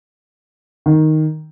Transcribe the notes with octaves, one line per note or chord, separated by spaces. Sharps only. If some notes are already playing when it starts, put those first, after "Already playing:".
D#3